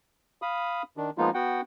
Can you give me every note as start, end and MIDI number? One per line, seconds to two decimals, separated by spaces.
0.42 0.82 77
0.42 0.82 83
0.42 0.82 87
0.97 1.10 51
0.97 1.10 62
1.18 1.30 53
1.18 1.30 56
1.18 1.30 58
1.18 1.30 59
1.18 1.30 63
1.18 1.30 65
1.34 1.61 59
1.34 1.61 66
1.34 1.61 78
1.34 1.61 79